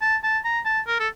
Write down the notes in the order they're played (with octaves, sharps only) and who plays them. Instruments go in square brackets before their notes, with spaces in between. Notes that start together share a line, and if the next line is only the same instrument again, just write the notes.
[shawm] A5
A5
A#5
A5
A#4
A4